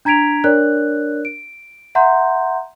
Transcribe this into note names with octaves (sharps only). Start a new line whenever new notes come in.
D4 A#5 G#6 B6 D7 F7
D4 A#4 C#5 D5 F#6
D7
E5 F#5 A#5 C6 G6